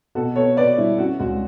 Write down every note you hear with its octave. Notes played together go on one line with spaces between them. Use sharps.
B2 F#4 A4
B3 A4 C#5
B2 B4 D5
G3 E4
C#4 F#4
C#2 F#4